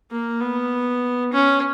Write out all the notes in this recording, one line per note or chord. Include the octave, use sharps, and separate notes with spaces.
A#3
B3
C#4